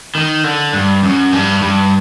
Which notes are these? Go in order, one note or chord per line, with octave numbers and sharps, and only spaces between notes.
D#3
D3
G2
F#2
G2
G2